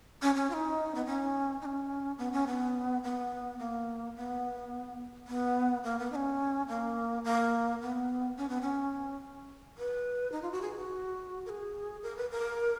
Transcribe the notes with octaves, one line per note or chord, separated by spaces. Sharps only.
C#4
C#4
F4
D#4
B3
C#4
D#4
C#4
B3
C#4
B3
B3
A#3
B3
B3
A#3
B3
D#4
C#4
A#3
A#3
B3
C#4
B3
C#4
B4
D#4
F4
F#4
G#4
F#4
A#4
G#4
A#4
B4
A#4